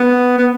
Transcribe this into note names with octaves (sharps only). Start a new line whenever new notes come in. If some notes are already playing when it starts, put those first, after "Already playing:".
Already playing: B3
B3